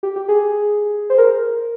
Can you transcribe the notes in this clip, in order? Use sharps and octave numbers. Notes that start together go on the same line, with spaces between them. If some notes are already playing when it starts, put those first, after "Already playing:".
G4
G4
G#4
C5
A#4